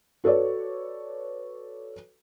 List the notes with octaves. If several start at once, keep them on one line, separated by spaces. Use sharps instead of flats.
F#4 A4 B4 C#5 D5